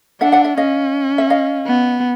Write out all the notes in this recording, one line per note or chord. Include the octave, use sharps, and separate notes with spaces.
D4 E5 F#5
E5 F#5
E5 F#5
C#4 D#5 F5
E5
D#5 F5
B3